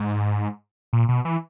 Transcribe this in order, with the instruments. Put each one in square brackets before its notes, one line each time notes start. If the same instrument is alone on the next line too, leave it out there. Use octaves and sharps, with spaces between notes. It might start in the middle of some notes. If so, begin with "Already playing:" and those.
Already playing: [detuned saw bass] G#2
A#2
B2
E3